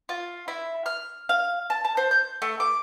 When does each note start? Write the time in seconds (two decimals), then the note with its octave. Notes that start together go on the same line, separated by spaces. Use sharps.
0.09 F4
0.48 E4
0.86 F6
1.29 F5
1.70 A5
1.85 A5
1.97 C5
2.11 G6
2.42 A3
2.60 D6